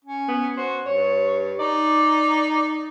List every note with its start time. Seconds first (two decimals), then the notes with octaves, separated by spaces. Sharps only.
0.04 C#4
0.28 B3
0.57 F#4 C5
0.86 G2 C#5
1.59 D#4 D5